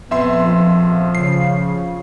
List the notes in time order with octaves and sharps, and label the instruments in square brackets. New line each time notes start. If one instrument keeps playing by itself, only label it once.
[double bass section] A#1 [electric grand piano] F2 E5 C6 [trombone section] B3
[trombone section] F3
[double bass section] C#3 [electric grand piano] C7